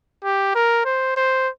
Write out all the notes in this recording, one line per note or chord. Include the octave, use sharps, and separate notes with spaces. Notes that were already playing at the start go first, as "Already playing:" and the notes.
G4
A#4
C5
C5